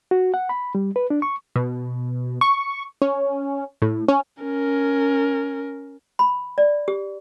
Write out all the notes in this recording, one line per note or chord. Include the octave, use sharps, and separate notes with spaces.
F#4
F#5
B5
G3
B4
D4
C#6
B2
C#6
C#4
A2
C#4
C#4 A#4
B5
D5
G4